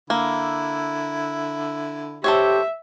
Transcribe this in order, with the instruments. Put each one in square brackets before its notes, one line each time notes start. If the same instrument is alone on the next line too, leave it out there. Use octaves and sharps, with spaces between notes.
[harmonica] D3 E4 [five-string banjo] A#3
[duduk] G4 [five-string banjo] A4 C5 C#5 [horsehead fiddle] E5